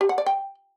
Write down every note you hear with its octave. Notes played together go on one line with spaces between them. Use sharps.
G4
F#5
D5
G5